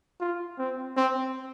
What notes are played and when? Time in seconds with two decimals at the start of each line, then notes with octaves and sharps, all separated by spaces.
0.20 F4
0.58 C4
0.97 C4